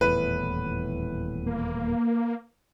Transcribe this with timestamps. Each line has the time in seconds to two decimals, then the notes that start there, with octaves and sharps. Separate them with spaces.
0.01 D#1 E2 A2 B4
1.46 A#3